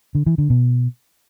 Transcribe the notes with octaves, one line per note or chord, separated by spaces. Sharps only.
D3
E3
D3
B2